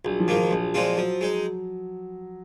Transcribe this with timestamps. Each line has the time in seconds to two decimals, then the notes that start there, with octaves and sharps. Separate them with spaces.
0.05 A#1 F#3
0.20 F3
0.28 G#2 D#3 A#3
0.36 F3
0.51 A#1
0.74 A#2 G#3 C4 F4
0.97 F3 F#3
1.21 G#3 D#4